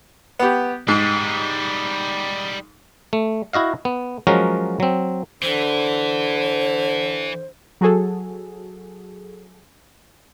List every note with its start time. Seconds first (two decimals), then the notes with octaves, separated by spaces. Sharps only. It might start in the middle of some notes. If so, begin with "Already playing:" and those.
0.39 B3 G4
0.88 G#2 G3 D#4
3.13 A3
3.53 E4 F#4 D#5 F5
3.85 B3
4.27 F3 F#3 G#3 C#4 F#4 A#4
4.80 F#3 C4
5.43 D3 E3 C5
7.81 F#3 F#4 G#4 A4